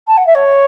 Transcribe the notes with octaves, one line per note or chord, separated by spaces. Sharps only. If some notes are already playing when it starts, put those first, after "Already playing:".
A5
F#5
E5
C#5